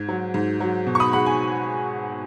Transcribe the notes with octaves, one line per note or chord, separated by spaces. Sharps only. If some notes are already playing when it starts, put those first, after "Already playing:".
Already playing: G#2 G#6
F#3
G#2
F#3
B2
C#6
B5 D#6
G#3 F#5 B5
G#5